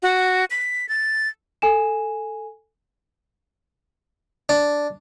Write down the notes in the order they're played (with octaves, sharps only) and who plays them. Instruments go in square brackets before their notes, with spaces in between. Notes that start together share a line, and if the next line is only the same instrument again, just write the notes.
[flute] F#4
B6
A6
[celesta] A4 G#5 E7
[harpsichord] D4